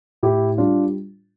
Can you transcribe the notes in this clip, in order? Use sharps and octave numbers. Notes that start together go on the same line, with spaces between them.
A2 E4 G4
G3 D4 F4